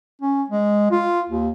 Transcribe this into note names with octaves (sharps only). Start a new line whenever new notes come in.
C#4
G#3
F4
D#2